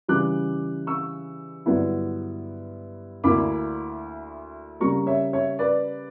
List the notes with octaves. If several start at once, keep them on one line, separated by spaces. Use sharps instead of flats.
C#3 E3 G3 D6 F#6
C#6 E6
G2 D3 F#3 B3 E4
D2 D3 A#3 E4 B5 D6
C#3 G3 A#3 A#5 C#6
C#5 E5
C#5 E5
B4 D5